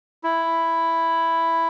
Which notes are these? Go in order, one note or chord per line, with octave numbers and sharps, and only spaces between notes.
E4